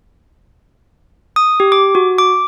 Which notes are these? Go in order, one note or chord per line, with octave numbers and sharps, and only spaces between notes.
D#6
G4
D6
F#4
D6